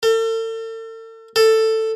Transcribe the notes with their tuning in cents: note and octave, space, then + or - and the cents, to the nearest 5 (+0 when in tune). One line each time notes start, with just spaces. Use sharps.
A4 +40
A4 +10